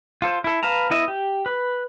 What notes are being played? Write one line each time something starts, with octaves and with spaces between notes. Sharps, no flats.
F4 A4 C5
E4 A4
B4 F5 A5 A#5
B3 E4 D#5 E5
G4
B4